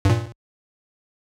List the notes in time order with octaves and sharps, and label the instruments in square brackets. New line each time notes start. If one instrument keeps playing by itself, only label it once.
[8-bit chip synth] G2 A#2